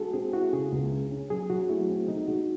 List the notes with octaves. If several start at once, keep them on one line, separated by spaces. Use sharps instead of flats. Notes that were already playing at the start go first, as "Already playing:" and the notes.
Already playing: G#3 F#4 A4
C4 G#4
E4 F#4
C#3 G#4
C#2
C#3
C#4
F#3 G#4
F#3 F#4
A3 E4
C4
G#3 D#4
G#3 F#4